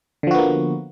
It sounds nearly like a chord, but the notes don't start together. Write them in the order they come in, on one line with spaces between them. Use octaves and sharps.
D3 F3 F#4 B3 A#3